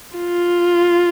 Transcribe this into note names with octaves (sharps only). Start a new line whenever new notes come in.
F4